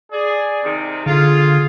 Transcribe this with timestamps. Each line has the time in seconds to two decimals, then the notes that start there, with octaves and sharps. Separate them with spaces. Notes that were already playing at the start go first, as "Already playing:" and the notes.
0.12 G#4 D5
0.63 C3 D#3 C4
1.06 D3 F4 G#4